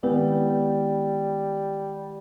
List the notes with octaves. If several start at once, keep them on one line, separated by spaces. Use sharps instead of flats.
D#3 G3 G#3 B3 E4